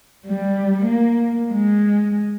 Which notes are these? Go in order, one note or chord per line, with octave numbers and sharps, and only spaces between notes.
G3
A#3
G#3